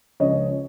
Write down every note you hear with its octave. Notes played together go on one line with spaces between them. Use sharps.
C#2 C#3 F3 C#5 D#5